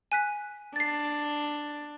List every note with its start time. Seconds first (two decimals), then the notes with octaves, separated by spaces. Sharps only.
0.12 G#5 F#6 B6
0.76 D4 A6 C7